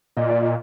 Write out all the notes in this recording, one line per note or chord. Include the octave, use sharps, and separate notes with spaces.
A#2 D#5
D5
D#5